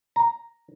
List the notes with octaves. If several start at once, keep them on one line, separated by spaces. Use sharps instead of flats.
A#5